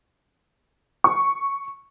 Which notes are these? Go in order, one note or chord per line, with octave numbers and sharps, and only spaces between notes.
C#6